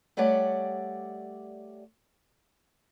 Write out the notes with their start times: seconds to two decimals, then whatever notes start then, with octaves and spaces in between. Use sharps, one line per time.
0.17 G3 A3 G4 C#5 D5 F#5